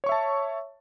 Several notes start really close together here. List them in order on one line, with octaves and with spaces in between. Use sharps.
C#5 C#6 E5 A5